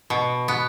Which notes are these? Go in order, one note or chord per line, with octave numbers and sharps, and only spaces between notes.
B2
B3